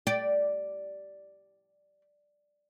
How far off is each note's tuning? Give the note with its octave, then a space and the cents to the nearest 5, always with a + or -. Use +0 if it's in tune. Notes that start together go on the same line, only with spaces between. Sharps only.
G4 -15 D5 +0